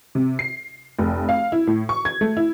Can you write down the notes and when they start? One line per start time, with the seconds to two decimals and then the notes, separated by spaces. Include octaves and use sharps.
0.15 C3
0.39 C7
0.99 F1
1.29 F5
1.52 E4
1.67 A2
1.89 C#6
2.05 G#6
2.21 A3
2.37 E4